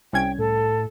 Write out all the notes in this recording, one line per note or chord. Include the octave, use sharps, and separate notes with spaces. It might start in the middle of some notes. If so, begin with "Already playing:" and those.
C2 C#4 G5 G#6
A2 A4